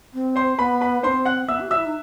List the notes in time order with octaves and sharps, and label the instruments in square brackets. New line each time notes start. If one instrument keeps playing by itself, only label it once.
[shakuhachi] C4
[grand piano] C5 C6
[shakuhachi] B3 [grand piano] B4 B5
[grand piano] B4 B5
[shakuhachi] C4 D#4 [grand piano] C5 C6
[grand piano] F#5 F#6
[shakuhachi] B3 [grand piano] E5 E6
[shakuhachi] G4
[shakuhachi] F#4 [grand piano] E5 E6
[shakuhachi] E4
D#4